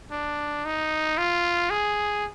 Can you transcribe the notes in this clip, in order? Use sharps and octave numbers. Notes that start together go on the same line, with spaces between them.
D4
D#4
F4
G#4